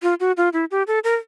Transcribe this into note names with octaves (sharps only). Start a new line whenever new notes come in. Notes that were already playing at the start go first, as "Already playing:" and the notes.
F4
F#4
F4
E4
G4
A4
A#4